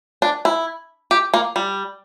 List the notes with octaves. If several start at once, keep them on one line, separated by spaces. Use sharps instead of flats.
D4
E4
G4
A#3
G3